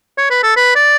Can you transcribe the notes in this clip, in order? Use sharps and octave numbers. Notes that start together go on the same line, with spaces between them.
C#5
B4
A4
B4
D5